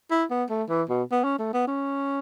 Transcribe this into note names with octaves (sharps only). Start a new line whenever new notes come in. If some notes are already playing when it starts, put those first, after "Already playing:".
E4
B3
A3
E3
B2
B3
C#4
A3
B3
C#4